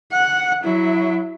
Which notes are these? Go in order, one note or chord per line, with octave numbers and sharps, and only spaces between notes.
F#5
F#3 E4